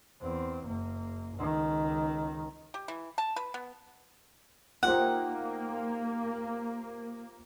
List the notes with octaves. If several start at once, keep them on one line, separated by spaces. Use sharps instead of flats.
E2 C4
F#1 A#3
C#2 D#3
G4
E3
A5
B4
B3
A#3 D#4 F4 G4 C5 F#5